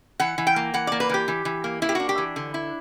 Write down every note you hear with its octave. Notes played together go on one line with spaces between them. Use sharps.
E3 F#5
E3
G5
A#3
E3 F#5
A#3 D5
B4
E3 G4
E3
E3
A#3
A#3 E4
G4
D4 F#4
G4
E3
D3
E4